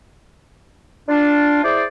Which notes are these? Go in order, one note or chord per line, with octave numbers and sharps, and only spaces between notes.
D4 F4
E4 G#4 C5 D5